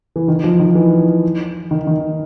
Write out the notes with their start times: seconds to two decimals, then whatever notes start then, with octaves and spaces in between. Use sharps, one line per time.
0.16 E3
0.28 D#3
0.44 F3
0.59 D#3
0.75 E3
1.71 D#3
1.87 D#3